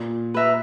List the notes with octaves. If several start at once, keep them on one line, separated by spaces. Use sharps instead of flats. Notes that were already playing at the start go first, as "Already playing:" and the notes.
Already playing: A#2
B4 E5 A#5